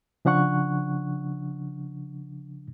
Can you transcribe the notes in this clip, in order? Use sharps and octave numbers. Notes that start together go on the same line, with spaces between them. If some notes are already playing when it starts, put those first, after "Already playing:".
C#3 F3 D4 F#5 C#6 F#6